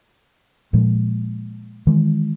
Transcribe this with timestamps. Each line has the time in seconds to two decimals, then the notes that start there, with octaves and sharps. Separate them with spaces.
0.73 A#2 F3 G#3
1.87 D#3 E3 G#3